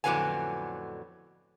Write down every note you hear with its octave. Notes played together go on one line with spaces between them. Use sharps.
F2 A2 D3 F#3 B3 G#5